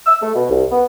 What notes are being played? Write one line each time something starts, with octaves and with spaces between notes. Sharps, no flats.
E6
A3
B2
C2
B3